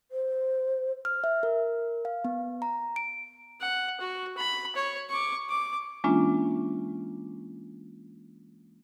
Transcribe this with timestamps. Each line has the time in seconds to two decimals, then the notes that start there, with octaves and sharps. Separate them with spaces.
0.11 C5
1.05 F6
1.24 E5
1.43 A#4
2.05 F5
2.25 B3
2.62 A#5
2.96 D7
3.61 F#5
4.00 F#4
4.37 B5
4.75 C#5
5.10 C#6 D6
5.49 D6
6.04 E3 G#3 A#3 C#4 D4 F4